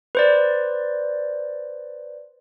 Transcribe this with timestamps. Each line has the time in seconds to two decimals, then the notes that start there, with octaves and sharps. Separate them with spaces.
0.15 B4 C5 D5